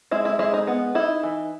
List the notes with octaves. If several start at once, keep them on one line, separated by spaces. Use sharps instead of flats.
G#3 E4
E4
G#3 E4
D#4
B3
D#4 E4
E3